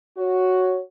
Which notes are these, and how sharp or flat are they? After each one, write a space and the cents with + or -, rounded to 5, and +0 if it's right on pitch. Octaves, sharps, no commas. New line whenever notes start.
F#4 +0 C#5 +0